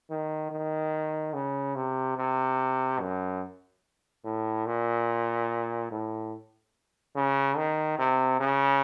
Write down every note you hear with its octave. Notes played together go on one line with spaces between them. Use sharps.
D#3
D#3
C#3
C3
C3
F#2
A2
A#2
A2
C#3
D#3
C3
C#3